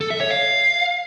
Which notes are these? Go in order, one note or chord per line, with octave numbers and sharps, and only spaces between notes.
A4
E5
C#5
F5